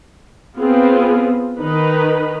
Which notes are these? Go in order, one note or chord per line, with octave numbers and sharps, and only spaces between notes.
B3 C4 F4 G#4
D#3 D#4 B4